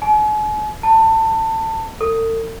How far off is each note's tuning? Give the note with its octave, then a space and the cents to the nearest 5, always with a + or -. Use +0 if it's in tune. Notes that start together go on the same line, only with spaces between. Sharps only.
G#5 +40
A5 +25
A4 +45